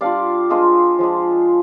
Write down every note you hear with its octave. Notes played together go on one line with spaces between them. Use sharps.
G3 D4 F4 D5 F5
G#3 D4 F4 C5 D#5
F3 G#3 D4